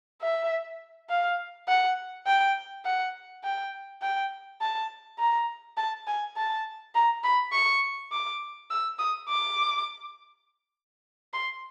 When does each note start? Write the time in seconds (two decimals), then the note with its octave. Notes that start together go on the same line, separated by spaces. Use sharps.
0.22 E5
1.10 F5
1.68 F#5
2.27 G5
2.85 F#5
3.44 G5
4.02 G5
4.61 A5
5.19 A#5
5.77 A5
6.07 G#5
6.37 A5
6.95 A#5
7.24 B5
7.53 C#6
8.12 D6
8.70 E6
8.99 D#6
9.29 D6
11.33 C6